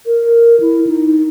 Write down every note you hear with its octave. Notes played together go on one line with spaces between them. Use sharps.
A#4
E4
D#4